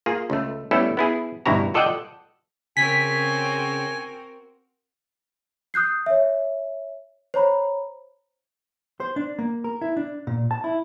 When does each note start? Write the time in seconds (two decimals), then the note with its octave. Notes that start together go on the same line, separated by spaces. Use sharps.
0.06 A#3 F4 G#4
0.30 C#2 A3
0.71 G3 A3 B3 C#4 E4 A4
0.97 B3 E4 G#4
1.46 D2 G2 B2 E4 F#4 A#5
1.74 F4 A4 D5 D#5 F#5 G5
2.77 C#3 C4 F#4 A#4 G#5 B6
5.74 D#6 F#6 G6 C7
6.06 C#5 E5
7.34 C5 C#5 A#5 B5
9.00 C5
9.16 D4
9.39 A#3
9.64 A#4
9.81 E4
9.97 D4
10.27 A#2
10.51 A5
10.64 E4